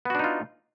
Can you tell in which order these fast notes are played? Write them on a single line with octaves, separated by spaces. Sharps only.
B3 F#4 D4 D#4 F4